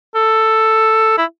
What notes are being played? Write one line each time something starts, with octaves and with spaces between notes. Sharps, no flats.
A4
E4